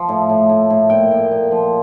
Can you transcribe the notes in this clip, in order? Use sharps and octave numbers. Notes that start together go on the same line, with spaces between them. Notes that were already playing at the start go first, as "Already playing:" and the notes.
Already playing: F3
A2
A2
A2
A2
A#2 G5
A#2
A#2
F3